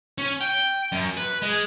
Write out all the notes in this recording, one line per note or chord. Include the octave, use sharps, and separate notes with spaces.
C#4
G5
F#2
B4
G#3